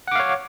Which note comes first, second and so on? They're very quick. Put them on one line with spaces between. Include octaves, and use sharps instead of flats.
F#5 D6 F5 C#5